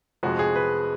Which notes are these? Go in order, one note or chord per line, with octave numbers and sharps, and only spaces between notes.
F1 F2 F3 G#3 F#4
G#4
B4